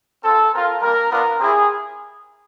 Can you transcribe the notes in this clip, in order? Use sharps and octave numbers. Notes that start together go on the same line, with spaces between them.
C4 F4 A4
C4 F4 A#4
G3 A#3 D4 A#4
B3 D4 F4 A#4
C4 E4 G4 G#4